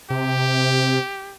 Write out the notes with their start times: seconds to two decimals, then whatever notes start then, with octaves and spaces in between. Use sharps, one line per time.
0.10 C3 G4